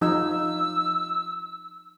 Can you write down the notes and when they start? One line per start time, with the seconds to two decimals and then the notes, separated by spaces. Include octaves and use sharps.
0.01 F3 D#4 E6